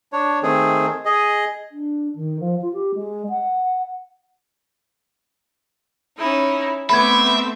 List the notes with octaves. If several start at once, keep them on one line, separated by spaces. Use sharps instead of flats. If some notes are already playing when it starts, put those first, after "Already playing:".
D4 C#5
D#3 A3 C4 G#4
G#4 D#5
D4
D#3
F3
F4
G4
G#3
F#5
C#4 D#4 E4
A3 B3 C4 E5 B5 D6 G#6